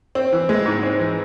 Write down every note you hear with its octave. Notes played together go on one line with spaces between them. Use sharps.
C4
E3
G#3
G#2
C4
E3